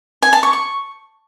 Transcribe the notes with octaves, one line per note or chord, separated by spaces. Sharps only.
G#5
A5
C#6
C#6